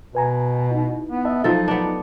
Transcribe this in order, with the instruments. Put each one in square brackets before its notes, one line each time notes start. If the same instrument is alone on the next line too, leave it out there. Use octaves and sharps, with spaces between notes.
[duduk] B2 [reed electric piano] B4 G#5 A#5
[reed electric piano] D#4 E4
[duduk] B3
[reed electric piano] D#5 E5 A5
[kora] F3 A4 [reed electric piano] F#3 [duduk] D#4
[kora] B3 D4